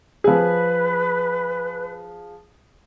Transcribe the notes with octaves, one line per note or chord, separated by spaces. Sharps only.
F3 G#4 B4